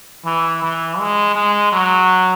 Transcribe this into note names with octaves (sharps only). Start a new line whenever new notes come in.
E3
E3
G#3
G#3
F#3